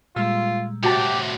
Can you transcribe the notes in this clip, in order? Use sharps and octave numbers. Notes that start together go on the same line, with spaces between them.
A#2 G3 G#3 F4 E6
A2 C3 F#4 G4 A5